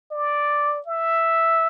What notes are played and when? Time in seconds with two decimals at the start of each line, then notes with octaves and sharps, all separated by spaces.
0.11 D5
0.87 E5